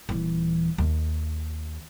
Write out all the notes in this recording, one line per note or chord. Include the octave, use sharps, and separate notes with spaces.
D#1 E3
D#2